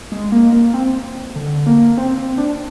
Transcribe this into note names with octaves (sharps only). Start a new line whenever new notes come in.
G#3
A#3
A#3
C4
D3
A#3
C4
C4
D4